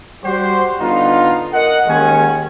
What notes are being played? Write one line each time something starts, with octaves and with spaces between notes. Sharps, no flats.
G3 F#4 G4 C5
D3 B3 D#4 F4
A#4 D#5 F#5
D#2 D#3 G#3 C#4 G#5